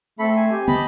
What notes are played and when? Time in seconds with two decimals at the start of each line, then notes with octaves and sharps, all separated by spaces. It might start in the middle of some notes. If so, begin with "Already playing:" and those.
0.19 A3 C4 A4 B5
0.37 G#5
0.51 G4
0.68 D3 B3 D#5 A5 B5